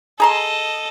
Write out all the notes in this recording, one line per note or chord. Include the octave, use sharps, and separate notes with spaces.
G#4 A4 D#5 A#5 C6